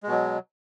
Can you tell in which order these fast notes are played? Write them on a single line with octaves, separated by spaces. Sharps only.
G#3 B2 F#3